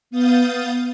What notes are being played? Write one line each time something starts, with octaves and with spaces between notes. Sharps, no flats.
B3 F5 D#6 G6 A6